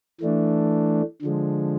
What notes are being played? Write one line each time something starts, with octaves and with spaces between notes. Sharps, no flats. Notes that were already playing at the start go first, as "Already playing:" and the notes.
E3 A3 D4
D3 F3 G#3